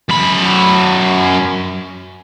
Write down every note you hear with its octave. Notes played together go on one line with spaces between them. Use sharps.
F#2 B5